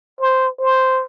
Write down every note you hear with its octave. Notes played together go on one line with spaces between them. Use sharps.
C5
C5